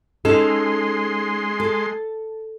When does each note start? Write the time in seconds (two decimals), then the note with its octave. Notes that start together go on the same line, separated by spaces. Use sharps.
0.25 G#3 C#4 D#4 A4 C6
1.60 A4